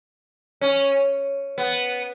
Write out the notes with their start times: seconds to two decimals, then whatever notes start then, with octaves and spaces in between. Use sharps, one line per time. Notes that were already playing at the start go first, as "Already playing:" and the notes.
0.61 C#4
1.58 B3